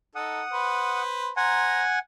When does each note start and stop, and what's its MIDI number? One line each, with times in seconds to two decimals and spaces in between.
0.15 0.42 63
0.15 0.42 69
0.15 1.02 78
0.15 1.02 87
0.52 1.29 71
0.52 1.29 72
1.37 1.82 72
1.37 1.99 78
1.37 1.99 80
1.37 1.82 82